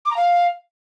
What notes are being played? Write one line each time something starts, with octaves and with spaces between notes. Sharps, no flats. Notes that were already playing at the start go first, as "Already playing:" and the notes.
D6
A#5
F5